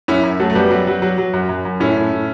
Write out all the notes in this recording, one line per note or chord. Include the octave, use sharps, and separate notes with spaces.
F#2 C#4 E4
F#2
F#3 A3
A3
F#2 G3 B3
F#3
F#3
F#3
F#3
F#2
F#2
F#2
A2 C#4 E4
A2
A2